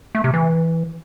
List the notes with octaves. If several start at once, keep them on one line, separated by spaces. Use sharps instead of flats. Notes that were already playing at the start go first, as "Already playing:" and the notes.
A3
C3
E3